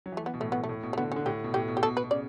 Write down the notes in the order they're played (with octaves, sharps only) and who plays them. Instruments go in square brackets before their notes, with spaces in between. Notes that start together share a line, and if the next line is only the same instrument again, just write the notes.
[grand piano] F#3
[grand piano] E3 [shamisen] A3
[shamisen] B3
[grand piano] B2
[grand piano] A2 [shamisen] A3
[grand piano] B2 [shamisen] B3
[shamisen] A3
[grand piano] A2
B2
[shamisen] A3
[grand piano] D3 [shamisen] B3
[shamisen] C#4
[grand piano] D3
[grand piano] A2 [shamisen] G4
[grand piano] B2
[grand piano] A2 [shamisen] G4
[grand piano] B2
[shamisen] G4
[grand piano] B2 [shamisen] A4
[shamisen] B4
[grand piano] B2
[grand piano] C#3 [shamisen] D5